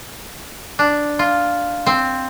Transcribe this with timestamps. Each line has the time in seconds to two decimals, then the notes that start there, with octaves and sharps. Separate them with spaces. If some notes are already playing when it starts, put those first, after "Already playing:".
0.79 D4
1.19 F4
1.86 C4